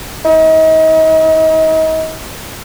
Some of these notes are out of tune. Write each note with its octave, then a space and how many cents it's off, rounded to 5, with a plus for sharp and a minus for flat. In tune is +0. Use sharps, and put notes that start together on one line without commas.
D#4 +35